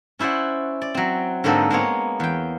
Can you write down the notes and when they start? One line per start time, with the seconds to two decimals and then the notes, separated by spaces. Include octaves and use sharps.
0.19 C#4 E4 C5 D5 F#5
0.82 D5
0.95 F#3 C4
1.44 G#2 D3 A#3 C4 A4 D#5
1.71 G#3 A#3 B3 C#5
2.20 E2 G5